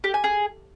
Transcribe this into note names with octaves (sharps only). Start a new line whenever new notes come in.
G4
G#5
G#4